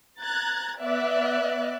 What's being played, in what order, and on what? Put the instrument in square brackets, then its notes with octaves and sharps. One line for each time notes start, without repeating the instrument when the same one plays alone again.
[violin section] A#5 F#6 G#6 A6
B3 D5 E5 F#6